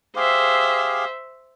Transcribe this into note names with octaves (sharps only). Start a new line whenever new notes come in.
G4 G#4 C5 E5 F5